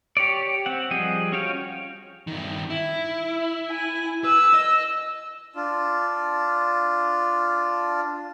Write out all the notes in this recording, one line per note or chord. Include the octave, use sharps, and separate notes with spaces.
G4 C#5 D5
C4 F#5
F3 G3 G#4 D#5 G5
C#4 F#4 C#5 F5 G5
G2 D#3
E4
G#5
B4 E6
D#5
D4 F4